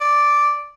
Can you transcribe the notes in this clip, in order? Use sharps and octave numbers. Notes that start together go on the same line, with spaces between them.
D5